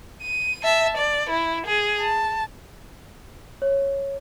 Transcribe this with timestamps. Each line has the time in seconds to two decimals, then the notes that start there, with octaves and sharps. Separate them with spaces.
0.22 D#7
0.64 E5 A5
0.97 D5
1.30 E4
1.66 G#4
2.00 A5
3.62 C#5